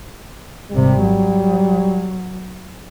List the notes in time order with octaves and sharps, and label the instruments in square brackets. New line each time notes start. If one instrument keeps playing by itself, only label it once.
[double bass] G#1 C3 [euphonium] G3
[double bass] F#3